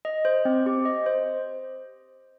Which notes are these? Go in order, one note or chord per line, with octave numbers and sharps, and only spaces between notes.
D#5
C5
C4
G4
D#5
C5